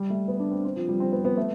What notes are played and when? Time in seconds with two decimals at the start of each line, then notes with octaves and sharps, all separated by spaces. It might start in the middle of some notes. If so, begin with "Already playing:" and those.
Already playing: G3
0.10 A3
0.28 B3
0.40 D4
0.51 C4
0.65 C4
0.76 F3
0.89 G3
1.00 C4
1.12 B3
1.25 B3
1.37 A3